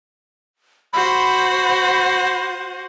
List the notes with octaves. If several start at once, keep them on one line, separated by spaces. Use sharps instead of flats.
F#4 C5 B5